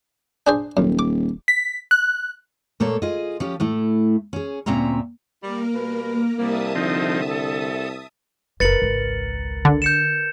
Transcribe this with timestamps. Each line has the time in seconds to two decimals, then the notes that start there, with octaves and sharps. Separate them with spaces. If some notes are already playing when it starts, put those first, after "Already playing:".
0.47 D4 G#4 C5
0.77 D#1 F#2
0.99 D6
1.48 B6
1.91 F#6
2.80 A#2 A3 A#3 A4 C#5
3.02 F4 G#4 D#5
3.40 F3 C#4 G4
3.60 A2 A3 E4
4.33 C#4 G#4
4.66 D2 A#2 C4 C#4 E5 A#5
5.43 G3 A#3 A#4
5.74 B2 G3 B4
6.39 C2 G3 A#3 E5 A5 D#6
6.75 D3 F3 C4 D#4
7.31 A4
8.60 F#1 A#4 B4 A6 C#7 F#7
8.82 G#1 C#2
9.65 D3
9.82 G6 C#7 E7